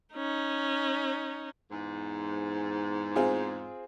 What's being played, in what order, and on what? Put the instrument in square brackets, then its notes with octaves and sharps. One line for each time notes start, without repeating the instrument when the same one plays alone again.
[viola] C#4 D#4
[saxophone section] E2 G#2
[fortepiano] C4 F4 G#4